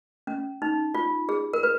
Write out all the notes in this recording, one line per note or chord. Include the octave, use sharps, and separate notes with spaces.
C#4
D#4
F4
G#4
A#4
B4